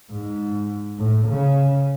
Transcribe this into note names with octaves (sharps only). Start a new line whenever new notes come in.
G#2
A2
C#3